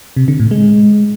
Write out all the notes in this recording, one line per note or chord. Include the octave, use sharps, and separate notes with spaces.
C3
D3
A2
G#3